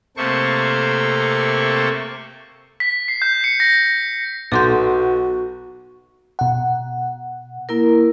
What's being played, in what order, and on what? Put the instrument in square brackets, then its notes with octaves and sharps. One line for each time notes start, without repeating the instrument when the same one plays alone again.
[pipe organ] C3 A3 A#3 A4 C5 C#6
[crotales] B6
C7
G6
C#7
A#6
[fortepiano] B1 D6 [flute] F#4 [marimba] A4 C6 G6
[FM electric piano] B2 F#5
[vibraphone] A#3 E4 A#4